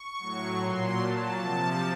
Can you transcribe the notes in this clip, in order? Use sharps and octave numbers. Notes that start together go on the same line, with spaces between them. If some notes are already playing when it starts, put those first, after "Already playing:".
Already playing: C#6
A2 F#3
A#2 F#3 C6
A#2 F#3 A5
C3 F3 A5